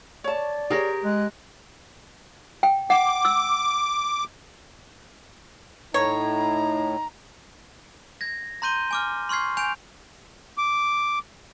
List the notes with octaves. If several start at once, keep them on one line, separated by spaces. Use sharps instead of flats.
C#5 D5 A5
G4 G#4 A#4 C#5
G#3 F#6
G5
F#5 D6
E6
A2 D#4 C#5 A#5
G#6 A#6
A#5 C6 G6 D#7 G7
G#5 D6 F6
C6 C#6 F6 G#6 C7
G#5 G6 D7 F7
D6